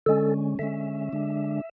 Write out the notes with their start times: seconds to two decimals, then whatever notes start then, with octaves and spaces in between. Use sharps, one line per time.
0.06 D3 G#3 C#4 A4
0.59 D3 G#3 C#4 E5
1.13 D3 G#3 D4